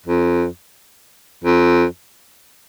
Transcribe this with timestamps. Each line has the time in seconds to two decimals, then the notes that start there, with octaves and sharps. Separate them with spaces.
0.06 F2
1.44 F2